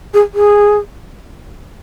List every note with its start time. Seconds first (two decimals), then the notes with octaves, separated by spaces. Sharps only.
0.14 G#4
0.34 G#4